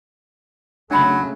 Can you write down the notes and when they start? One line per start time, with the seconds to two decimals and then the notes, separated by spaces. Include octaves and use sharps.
0.91 C#3 F#3 A3 D4 B5